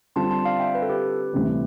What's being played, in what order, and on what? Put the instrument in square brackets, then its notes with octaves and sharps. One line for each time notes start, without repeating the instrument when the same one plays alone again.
[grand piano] D3 G3 C4 F4 [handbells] A5 C6
[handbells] A5 C6
D5 F5
E5 G5
B4
A4
G4 B4
[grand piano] D2 C3 E3 G3